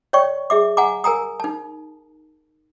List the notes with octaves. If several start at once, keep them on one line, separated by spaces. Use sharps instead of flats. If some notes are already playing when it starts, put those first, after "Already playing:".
C#5 D5 G5 C#6
G#4 E5 D6
F#5 G#5 A#5 D6
A#4 G#5 A#5 D#6
D#4 A5